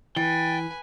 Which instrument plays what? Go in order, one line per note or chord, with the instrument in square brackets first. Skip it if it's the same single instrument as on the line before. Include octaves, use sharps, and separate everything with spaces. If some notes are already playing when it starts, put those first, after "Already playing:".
[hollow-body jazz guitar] E3 [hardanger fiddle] B4 G#5 [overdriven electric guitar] G5 [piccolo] A6